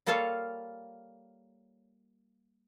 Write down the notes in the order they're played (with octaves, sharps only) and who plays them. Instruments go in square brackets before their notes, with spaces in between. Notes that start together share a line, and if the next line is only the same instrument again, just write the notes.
[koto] G3 A#3 F4 A4 C#5 F5